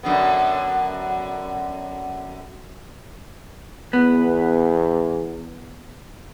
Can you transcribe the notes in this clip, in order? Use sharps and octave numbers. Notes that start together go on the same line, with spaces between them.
F#2 D3 B3
E2 B3